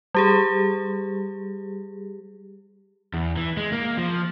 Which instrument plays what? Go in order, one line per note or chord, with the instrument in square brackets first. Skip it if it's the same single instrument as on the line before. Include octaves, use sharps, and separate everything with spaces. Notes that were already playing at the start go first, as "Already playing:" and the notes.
[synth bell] G3 G4 G#4
[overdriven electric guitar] E2
E3
G#3
A#3
F3